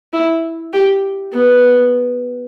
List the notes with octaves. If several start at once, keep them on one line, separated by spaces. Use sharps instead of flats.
E4
G4
B3